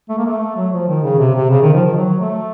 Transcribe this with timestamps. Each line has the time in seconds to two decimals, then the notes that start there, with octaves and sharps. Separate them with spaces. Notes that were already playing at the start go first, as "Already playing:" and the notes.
0.09 A3
0.18 A#3
0.27 A3
0.56 F#3
0.72 F3
0.88 D#3
1.03 C#3
1.18 C3
1.35 C3
1.50 C#3
1.62 D#3
1.74 F3
1.85 D#3
1.96 F#3
2.20 A3